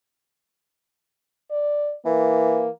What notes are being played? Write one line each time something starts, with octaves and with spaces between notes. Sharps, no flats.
D5
E3 A#3